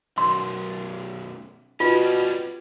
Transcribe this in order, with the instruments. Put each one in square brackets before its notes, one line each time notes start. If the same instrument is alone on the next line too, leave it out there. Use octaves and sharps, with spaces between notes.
[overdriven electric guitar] B1 F#2 [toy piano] C6
[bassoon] B2 [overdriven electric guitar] G3 C#4 [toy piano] F4